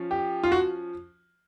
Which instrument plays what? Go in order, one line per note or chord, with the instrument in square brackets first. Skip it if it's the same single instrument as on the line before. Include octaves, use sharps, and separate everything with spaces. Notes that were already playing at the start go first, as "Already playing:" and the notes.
Already playing: [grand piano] F3 C#4
G4
F4
F#4